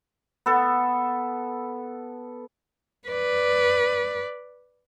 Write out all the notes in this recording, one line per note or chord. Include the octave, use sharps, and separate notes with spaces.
B3 A4
B4 D5